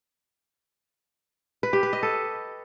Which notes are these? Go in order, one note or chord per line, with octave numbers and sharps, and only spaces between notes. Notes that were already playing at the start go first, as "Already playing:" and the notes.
B4
G4
B4
D#5
A4